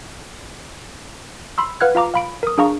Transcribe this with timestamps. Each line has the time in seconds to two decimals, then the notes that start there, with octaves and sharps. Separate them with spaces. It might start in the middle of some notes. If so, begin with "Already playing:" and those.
1.58 B5 C6 E6
1.80 B4 F5 F#5 F6 F#6 G#6
1.95 F4 F5 A#5 D6
2.14 F5 B5 D7
2.43 A#4 D#6
2.58 D4 G#4 F5 A#5 C#6